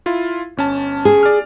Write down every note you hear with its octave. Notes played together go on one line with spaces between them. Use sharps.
E4 F4
G1 C#4 A5
G#4
D5 F6